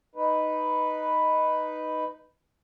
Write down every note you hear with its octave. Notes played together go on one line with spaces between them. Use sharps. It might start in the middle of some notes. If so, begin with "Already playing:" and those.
D#4 B4